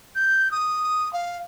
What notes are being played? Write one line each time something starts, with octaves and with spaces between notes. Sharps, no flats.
G6
D#6
F5